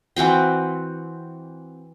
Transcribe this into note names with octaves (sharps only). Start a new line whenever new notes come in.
E3 C4 F#4 G5